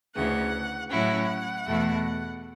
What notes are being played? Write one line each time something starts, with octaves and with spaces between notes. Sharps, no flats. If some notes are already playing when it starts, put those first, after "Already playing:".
D2 C#3 E3 F#5
A2 F#3 C#4 E4 F#5
E2 B2 A3 E4